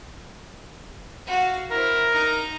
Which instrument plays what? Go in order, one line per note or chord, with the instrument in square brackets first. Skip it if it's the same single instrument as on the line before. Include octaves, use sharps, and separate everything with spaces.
[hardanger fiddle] F#4 F5
[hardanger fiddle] E4 C5 [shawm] A#4
[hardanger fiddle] D#4 A#5